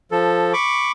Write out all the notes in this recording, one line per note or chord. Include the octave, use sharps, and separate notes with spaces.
F3 A4
B5 C#6 D6